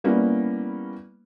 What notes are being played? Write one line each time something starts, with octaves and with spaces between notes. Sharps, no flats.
G3 A#3 B3 C#4 E4